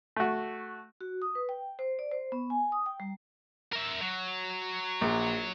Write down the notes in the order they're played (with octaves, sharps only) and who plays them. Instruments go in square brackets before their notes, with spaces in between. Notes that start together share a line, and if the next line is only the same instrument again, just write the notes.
[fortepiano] A3 F#4
[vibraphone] F#4
D#6
B4
G5
C5
D5
C5
B3
G#5
D#6
G5
G3
[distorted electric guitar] A#4 E5
F#3
[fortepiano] A#1